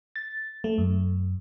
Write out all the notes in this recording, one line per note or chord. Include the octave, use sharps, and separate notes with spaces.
A6
A3
F#2